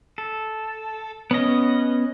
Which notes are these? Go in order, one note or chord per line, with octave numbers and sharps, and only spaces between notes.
A4
B3 C#4 D#5